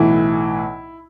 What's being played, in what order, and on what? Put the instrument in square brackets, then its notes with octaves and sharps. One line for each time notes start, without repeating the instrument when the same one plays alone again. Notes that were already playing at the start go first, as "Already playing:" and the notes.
Already playing: [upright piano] B1 A2 E3 E4